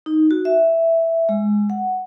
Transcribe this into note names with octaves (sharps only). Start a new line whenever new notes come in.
D#4
F#4
E5
G#3
F#5